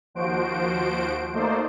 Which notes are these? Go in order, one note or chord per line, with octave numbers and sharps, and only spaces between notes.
D#2 F3 F#4 C5 D7
A3 A#3 D#4 C5 D5